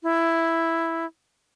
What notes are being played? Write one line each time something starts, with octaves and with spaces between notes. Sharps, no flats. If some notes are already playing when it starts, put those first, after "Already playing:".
E4